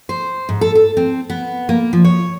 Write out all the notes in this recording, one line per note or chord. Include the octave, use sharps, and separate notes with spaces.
C5
G#2
A4
A4
C4
B3
A#3
F3
C#5